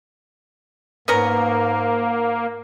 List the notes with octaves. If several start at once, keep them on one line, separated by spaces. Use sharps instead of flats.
G#2 A#3 B3 C#4 A#4